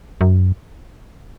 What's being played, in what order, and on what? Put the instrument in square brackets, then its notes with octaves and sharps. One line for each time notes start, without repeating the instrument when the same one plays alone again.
[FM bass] F#2